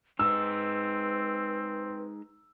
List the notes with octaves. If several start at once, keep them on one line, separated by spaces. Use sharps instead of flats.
G#3 C4 D#4 B4 E6